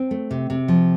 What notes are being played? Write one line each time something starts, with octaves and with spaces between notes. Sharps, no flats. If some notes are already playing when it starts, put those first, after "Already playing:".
Already playing: C4
A3
C3
C3
F3